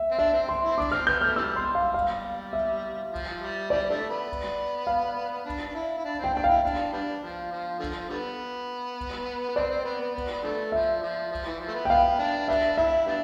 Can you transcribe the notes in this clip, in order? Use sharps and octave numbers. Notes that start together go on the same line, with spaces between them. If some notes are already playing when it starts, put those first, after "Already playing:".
Already playing: E5
C4
D4 E5
C4
C6
E4
C4
D4 D6
C4 F6
B3 G6
A3 F6
C3 E3 G3 E6
C6
G3
F5
F5
E5
F3
G3
C3 E3 G3 D5
D3 F3 A3
B3
F5
D4
D4
E4
E4
D4
C4 G5
D4 G5
E4 F5
D4
G3 B3 D4
F3
F3
D3 F3
D3 G3 B3
B3
C4 D5
C4
B3
B3
B3
B3
D3 F3 A3
F3 E5
F3
F3
E3
F3
A3
B3
G5
B3 F5
D4
G3 B3 D4 E5
E4 E5
G3 B3 D4